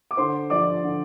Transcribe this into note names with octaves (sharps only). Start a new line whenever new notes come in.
D6
D3 C5 C6
F3 D5 D6
D3